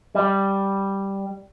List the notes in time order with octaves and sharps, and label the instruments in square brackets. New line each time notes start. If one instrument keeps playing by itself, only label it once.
[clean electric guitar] G3